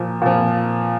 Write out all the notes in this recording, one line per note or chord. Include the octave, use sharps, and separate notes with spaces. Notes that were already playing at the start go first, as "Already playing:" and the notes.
Already playing: A#2 F3
A#2 F3